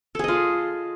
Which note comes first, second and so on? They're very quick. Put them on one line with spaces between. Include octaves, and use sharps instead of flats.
A4 G#4 D#5 F4